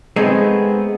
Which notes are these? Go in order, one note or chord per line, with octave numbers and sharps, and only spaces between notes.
G#3 A3 B3 C4 D#4 G#4